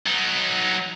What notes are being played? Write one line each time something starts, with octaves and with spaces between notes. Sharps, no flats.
F#3 D#4